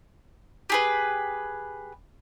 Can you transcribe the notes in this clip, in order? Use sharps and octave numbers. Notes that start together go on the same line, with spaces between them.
G4 G#4 B4